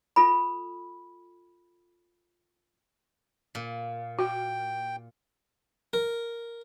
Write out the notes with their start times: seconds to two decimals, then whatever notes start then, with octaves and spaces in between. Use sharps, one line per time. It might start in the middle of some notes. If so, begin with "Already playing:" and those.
0.16 F4 A4 B5
3.55 A#2
4.19 F#4 G5
5.93 A#4